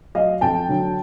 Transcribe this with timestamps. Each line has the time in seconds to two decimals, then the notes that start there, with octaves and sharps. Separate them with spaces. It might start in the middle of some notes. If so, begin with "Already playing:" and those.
0.15 F#3 D#5 F5
0.41 F2 G5 A5
0.69 D3 F#3